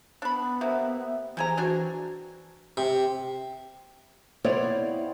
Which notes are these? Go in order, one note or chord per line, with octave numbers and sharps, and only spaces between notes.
B3 D4 B5
C3 A#3 E5
C3 E3 G#4 G#5 A#5
C4 D4 F#4 G#5
C3
B3 C4 E4 C#5 D5 F5